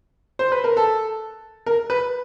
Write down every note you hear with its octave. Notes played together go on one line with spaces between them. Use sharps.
C5
B4
A#4
A4
A#4
B4